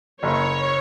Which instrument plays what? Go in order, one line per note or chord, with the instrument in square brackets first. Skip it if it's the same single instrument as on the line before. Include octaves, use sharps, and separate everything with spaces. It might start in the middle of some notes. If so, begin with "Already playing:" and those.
[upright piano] F#1 [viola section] C#5